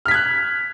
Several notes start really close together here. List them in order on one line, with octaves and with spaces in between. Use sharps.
F6 B6 G#6 F#6